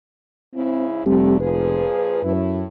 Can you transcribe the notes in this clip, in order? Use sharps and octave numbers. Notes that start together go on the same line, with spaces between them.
G#2 C#3 C4 E4
F1 A#2 D3 G3 A3 C4 G4
A#2 F3 G#4 B4
F#2 A2 E4